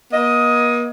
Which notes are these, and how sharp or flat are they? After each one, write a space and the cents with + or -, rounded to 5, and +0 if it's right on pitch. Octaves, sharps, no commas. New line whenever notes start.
A#3 +45 D#5 +10